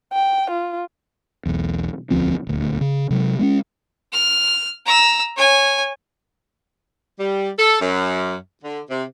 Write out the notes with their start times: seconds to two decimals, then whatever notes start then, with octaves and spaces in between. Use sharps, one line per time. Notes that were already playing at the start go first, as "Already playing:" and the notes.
0.13 G5
0.50 F4
1.46 E1 B1 E2
2.10 E1 D2 F3 C4
2.47 D#1 D2
2.81 C#3
3.10 C3 F#3 G#3
3.39 G#3 A#3 C#4
4.12 F6
4.86 A#5 E6
5.36 C#5 G#5
7.20 G3
7.59 A4
7.81 F#2
8.63 D3
8.90 C3